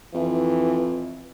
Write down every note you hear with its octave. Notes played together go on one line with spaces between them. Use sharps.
F2 E3